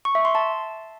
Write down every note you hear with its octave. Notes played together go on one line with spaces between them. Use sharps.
C#6
E5
C6
A5